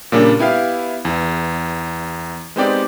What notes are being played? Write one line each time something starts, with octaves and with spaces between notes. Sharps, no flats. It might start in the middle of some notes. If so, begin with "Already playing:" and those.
A#2 C#3 G3 A#3 D4
B3 E4 G4 F5
E2
G#3 B3 C4 D#4 G4 D5